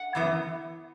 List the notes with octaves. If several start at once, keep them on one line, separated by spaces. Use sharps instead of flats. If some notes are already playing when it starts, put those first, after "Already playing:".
Already playing: F#5
F#2 E3 B3